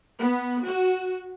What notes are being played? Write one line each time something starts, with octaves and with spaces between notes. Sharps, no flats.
B3
F#4